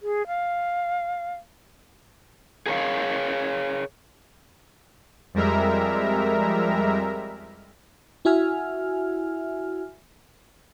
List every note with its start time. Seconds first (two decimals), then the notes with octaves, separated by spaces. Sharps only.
0.01 G#4
0.27 F5
2.66 G#4 A#4 C#5 F5
5.34 F2 G3 G#3 A#4 E5 A#5
8.25 E4 F#4 E5 G#5 F6